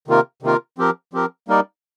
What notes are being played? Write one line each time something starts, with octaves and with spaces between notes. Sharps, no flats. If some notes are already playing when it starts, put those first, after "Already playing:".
C3 D#3 A#3 F4 A#4
C3 D#3 A#3 F4 A#4
F3 C4 G4 A#4
F3 C4 G4 A#4
G3 A#3 D#4 A#4 D5